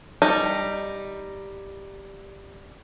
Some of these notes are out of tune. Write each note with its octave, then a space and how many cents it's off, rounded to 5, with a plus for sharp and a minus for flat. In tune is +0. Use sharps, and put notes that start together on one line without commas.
G3 +5 D#4 +0